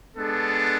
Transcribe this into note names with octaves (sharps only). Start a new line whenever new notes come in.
G#3 B3 D4 A4